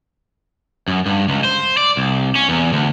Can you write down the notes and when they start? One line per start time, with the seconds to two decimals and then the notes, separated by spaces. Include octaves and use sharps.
0.88 F#2
1.06 G2
1.29 C#2
1.44 C5
1.77 D5
1.97 C2
2.35 C#4
2.49 E2
2.73 D2